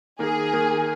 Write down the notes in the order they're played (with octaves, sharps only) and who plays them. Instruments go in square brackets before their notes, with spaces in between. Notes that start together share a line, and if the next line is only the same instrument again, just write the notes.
[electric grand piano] D#3 A#3 D#4 A#4 [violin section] G#4
[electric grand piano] D#3 A#3 D#4 A#4